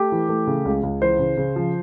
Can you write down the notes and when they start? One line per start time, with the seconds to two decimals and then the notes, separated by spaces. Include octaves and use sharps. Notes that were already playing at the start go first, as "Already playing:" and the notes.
Already playing: A3 G4
0.12 E3
0.29 A3
0.47 C#3
0.65 C#2
0.83 C#2
1.02 E3 C5
1.19 C#3
1.37 C#3
1.56 F3